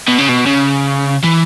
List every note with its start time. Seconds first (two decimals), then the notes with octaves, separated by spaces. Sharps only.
0.08 B2
0.18 C#3
0.29 B2
0.47 C#3
1.24 E3